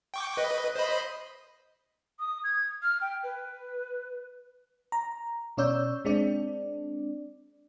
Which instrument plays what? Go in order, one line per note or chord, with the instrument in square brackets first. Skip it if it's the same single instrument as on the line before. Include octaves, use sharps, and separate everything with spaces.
[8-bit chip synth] G5 C#6 D6
B4 D#5
C5 D#5 B5
[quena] D#6
G#6
F6
G5
B4
[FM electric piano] A#5
B2 C#4 C#5 D5 E6 G6
G#3 C4 D4 D5